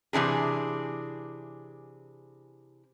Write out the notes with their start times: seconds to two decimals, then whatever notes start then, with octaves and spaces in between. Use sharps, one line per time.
0.13 C3 E3 D4 G#4